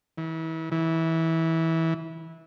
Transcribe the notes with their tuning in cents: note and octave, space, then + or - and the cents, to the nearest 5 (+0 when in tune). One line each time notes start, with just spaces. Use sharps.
E3 -35
E3 -20